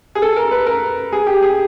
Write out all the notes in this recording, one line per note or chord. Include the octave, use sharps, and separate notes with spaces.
G#4
A4
A#4
B4
A#4
G#4
G4
G#4